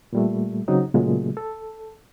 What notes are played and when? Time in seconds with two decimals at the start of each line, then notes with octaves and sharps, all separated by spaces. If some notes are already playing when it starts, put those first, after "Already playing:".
0.13 A#2 G3 A3
0.68 C#3 F#3 C4 D#4 F#4
0.94 A#2 C#3 F#3 G#3 A3
1.37 A4